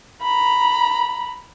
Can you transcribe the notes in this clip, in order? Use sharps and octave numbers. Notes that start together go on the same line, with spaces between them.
A#5 B5